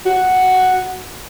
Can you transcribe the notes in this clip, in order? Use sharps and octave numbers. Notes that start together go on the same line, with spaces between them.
F#4